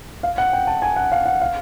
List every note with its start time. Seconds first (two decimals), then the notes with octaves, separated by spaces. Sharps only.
0.23 F5
0.38 F#5
0.53 G5
0.67 A5
0.82 G#5
0.96 F#5
1.12 F5
1.26 F#5
1.41 F5